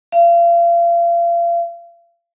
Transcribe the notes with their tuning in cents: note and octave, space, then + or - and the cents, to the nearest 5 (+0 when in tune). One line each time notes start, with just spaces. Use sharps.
F5 -35